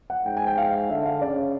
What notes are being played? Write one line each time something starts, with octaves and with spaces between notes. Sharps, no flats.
F#5
G#2 G5
G#5
G5
F5
D3 E5
F5
C#3 D5
C#5